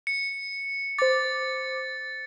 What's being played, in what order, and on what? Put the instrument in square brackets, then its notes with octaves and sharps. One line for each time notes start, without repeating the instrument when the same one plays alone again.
[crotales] C#7
[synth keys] C5 D6 [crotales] A6